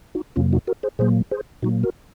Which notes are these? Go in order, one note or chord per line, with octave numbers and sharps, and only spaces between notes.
D#4 F#4
F2 C3 F#3 A#3 C#4 F4
D#4 F#4
F#4 A#4
G#4 C5
A#2 F#3 A#3 G#4 C5
G#4 C5
A#2 F#3 A#3 D#4 F#4
F#4 A#4